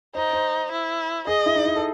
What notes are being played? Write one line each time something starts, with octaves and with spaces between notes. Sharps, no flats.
D#4 C5
C5
E4
G#4 D#5
E4
D#4
E4
A4